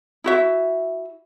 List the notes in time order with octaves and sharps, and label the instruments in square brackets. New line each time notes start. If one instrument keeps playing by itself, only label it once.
[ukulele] E4 F#4 E5